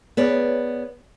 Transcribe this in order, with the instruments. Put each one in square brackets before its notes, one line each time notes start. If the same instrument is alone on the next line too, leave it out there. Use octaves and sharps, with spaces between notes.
[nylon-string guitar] B3 G#4 B4 C#5 D5